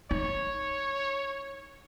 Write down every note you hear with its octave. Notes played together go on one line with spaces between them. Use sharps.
D#4 C#5